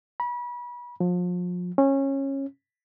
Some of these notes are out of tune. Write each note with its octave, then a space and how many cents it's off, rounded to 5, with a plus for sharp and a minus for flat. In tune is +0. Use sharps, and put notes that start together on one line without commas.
B5 -30
F3 +35
C#4 -20